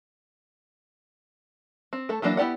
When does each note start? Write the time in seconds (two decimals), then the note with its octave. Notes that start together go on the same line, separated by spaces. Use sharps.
1.93 C4
2.09 A3 A4
2.22 E3 F#3 A#3 D4 E5
2.37 B3 E4 G4 D5 F#5